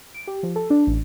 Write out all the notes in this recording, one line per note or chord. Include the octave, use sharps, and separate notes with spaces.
D7
G4
F3
A4
D4
A1